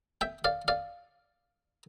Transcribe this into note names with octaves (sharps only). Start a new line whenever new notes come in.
E5 G5
D5 F5
D5 F5